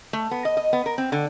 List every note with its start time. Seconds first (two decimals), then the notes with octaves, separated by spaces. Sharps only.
0.13 A3
0.31 B3
0.45 D#5
0.57 D#5
0.73 B3
0.86 A#4
0.98 C4
1.12 D3